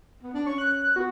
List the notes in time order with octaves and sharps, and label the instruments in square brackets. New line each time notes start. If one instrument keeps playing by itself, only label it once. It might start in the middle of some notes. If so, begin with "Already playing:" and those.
[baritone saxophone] B3
D4
[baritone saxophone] C#4 [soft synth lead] C#6
[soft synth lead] F#6
[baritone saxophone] B3 [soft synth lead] F#4